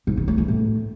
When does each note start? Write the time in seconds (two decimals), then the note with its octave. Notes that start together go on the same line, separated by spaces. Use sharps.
0.07 G#2
0.17 D#3
0.28 A3
0.38 E3
0.48 A2